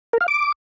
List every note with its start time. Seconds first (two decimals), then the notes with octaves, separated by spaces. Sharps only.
0.13 A#4
0.21 F5
0.28 D6